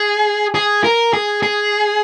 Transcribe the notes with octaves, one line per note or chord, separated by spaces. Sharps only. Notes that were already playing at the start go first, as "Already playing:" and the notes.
Already playing: G#4
G#4
A#4
G#4
G#4